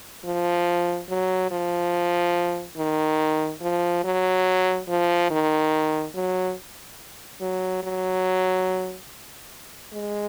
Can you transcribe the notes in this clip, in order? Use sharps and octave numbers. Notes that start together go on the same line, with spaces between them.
F3
F#3
F3
D#3
F3
F#3
F3
D#3
F#3
F#3
F#3
G#3